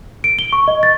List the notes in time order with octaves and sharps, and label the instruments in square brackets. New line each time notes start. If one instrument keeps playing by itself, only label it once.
[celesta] D7
G7
C#6
D#5
A6